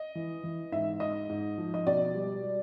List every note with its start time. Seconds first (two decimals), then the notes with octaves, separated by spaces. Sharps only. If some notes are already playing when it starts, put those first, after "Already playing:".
Already playing: D#5
0.15 E3
0.44 E3
0.72 G#2 E5
1.00 G#2 D#5
1.29 G#2
1.58 F3
1.74 D#5
1.87 B2 D5
2.15 G3
2.43 G3